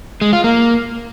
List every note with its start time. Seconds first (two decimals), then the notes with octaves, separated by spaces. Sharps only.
0.21 G#3
0.33 F4
0.44 A#3